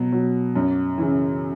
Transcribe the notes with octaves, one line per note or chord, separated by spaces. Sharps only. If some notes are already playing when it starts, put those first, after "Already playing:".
Already playing: B2 F#3
F#3
F#2
C#3 E3